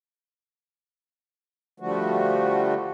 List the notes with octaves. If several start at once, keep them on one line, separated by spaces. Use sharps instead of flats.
D3 F3 G3 A3 F#4